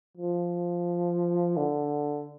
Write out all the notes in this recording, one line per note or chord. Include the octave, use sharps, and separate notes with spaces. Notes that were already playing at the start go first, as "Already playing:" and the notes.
F3
D3